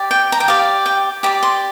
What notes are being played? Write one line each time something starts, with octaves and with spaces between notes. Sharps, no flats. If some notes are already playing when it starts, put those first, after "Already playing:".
Already playing: G4 D5
G5
A#5
G5
G4 D5 F5
G5
G4 D5 A#5
C6